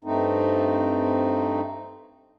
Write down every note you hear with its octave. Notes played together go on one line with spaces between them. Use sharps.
G2 A3 C4 D#4